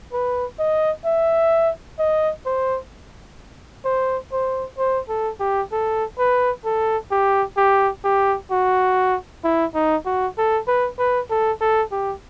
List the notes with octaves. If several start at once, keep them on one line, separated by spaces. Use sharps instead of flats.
B4
D#5
E5
D#5
C5
C5
C5
C5
A4
G4
A4
B4
A4
G4
G4
G4
F#4
E4
D#4
F#4
A4
B4
B4
A4
A4
G4